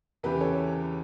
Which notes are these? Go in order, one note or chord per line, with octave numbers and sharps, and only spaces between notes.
E2 C#3 E3 G4 B4
A4 C#5